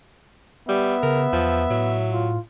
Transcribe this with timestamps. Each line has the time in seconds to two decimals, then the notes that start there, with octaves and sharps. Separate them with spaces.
0.68 G3 B3 E5
1.03 C#3 A#4
1.33 E2 F3
1.70 A2 F#3
2.12 F4